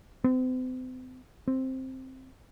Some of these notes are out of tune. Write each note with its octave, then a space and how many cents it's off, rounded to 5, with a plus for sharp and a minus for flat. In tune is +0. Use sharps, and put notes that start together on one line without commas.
C4 -40
C4 +5